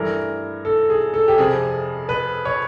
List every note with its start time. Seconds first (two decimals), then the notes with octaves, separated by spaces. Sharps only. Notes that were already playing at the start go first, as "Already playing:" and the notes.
Already playing: G2 E3 A3 A#4
0.65 A4
0.90 G#4
1.14 A4
1.28 G4
1.38 F2 C3 F3 G#4
2.09 B4
2.45 C#5